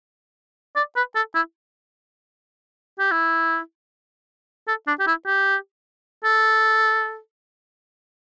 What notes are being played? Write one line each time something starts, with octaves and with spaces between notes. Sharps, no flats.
D5
B4
A4
E4
G4
E4
A4
D4
G4
E4
G4
A4